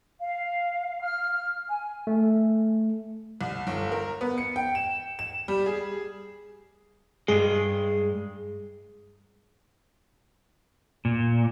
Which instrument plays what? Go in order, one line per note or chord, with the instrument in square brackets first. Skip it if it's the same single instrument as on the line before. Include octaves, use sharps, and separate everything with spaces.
[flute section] F5
F6
G#5
[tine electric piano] A3
[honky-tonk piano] C2
G1
A#4
B3
C#7
G5
E7
E7
G3
G#4
[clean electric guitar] G2 G#3 [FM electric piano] G#4
[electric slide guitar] A#2